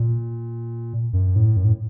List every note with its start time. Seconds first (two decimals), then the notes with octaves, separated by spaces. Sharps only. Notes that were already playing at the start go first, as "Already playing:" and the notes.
Already playing: A#2
1.13 F#2
1.36 A2
1.57 F#2
1.65 A2